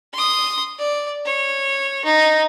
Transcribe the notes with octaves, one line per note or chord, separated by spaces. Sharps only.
C6 D#6
D5
C#5
D#4